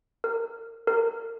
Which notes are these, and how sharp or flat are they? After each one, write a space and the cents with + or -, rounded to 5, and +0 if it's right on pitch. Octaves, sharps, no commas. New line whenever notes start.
A#4 -25
A#4 -25